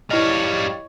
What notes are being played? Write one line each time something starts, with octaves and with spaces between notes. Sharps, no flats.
G3 E4 C#5 D#5 F5